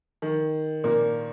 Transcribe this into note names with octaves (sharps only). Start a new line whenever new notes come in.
D#3
A#2 A#3